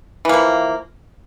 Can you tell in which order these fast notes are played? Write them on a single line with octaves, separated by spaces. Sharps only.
E3 A#3 F3